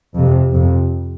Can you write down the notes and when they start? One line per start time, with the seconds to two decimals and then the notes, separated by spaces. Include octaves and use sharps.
0.15 F2 C3
0.52 F2 C3